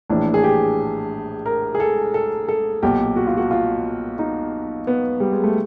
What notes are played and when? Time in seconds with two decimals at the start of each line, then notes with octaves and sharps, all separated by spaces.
0.10 A#1 A2 E3 D4
0.34 G#4
0.44 G4
1.46 A#4
1.75 G#4
1.80 A4
2.14 A4
2.49 A4
2.83 B1 A#2 G4
3.16 F#4
3.27 F4
3.37 F#4
3.51 F4
4.19 D#4
4.87 B3
5.20 G3
5.32 G#3
5.44 A3